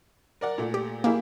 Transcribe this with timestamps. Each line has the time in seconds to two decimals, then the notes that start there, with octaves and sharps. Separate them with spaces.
0.41 A#4 D5 F#5
0.58 A#2 A3
0.74 G4
1.04 A#3 E4 G4 G#4